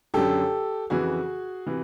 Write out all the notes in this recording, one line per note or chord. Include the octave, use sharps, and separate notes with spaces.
F#2 D3 G4 A4
F2 C#3 E3 F#4 G#4
C3 E3